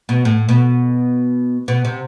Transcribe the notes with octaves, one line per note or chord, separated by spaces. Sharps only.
B2
A2
B2
B2
C3